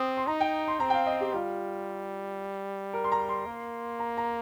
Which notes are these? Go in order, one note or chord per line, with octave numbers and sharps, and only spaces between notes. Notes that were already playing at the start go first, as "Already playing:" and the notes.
Already playing: C4 D#6
C6
D#4 A#5
G5
C6
C4 A#5
G5
F5
D#5
G4
G3 F4
A#4
C6
A#5
C6
A#3
A#5
A#5